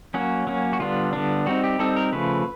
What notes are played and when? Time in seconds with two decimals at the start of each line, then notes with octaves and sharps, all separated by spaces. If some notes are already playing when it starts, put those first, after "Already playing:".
0.14 F#3 A#3 C#4 F#4
0.47 F#3 A#3 C#4
0.73 F#4
0.80 D3 G3 B3 D4 F4
1.13 D3 G3 B3 D4
1.46 G3 C4 D#4 F#4
1.64 G4
1.79 G3 C4 D#4 A4
1.96 A#4
2.12 C#3 F3 A3 B4